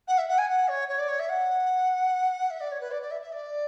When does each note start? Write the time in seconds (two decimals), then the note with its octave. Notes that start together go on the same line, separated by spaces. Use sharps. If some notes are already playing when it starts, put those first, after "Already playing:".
0.08 F#5
0.18 E5
0.28 F#5
0.38 G#5
0.49 F#5
0.68 C#5
0.89 C#5
0.99 D5
1.08 C#5
1.19 E5
1.29 F#5
2.50 E5
2.60 D5
2.72 C#5
2.81 B4
2.92 D5
3.02 D5
3.11 E5
3.22 E5
3.32 D5